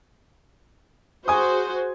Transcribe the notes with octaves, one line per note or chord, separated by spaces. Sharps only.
F#4 G#4 C5 G#5 D#6